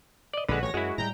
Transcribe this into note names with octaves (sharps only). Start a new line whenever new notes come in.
D5 D#5
A#1 D3 G#3 F#4 B4
A1 C#5 A#6
F#2 G#3 E4 F#4
A2 F#3 G3 G5 A#5